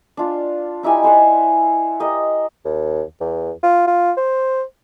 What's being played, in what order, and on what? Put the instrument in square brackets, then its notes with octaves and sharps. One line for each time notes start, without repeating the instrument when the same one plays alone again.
[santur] D4 F4
D#4 E4 G4 G#5
B4 C5 D5 F#5
G4 A#4 D#5
[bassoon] D#2
E2
F4
F4
C5